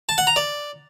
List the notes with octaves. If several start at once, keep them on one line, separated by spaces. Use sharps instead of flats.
A5
F#5
A#5
D5